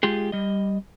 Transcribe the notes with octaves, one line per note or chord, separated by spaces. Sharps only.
G#3 F4 G4 G#4
G3 D#5